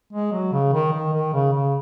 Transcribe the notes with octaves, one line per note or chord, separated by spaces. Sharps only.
G#3
F#3
C#3
D#3
D#3
D#3
C#3
C#3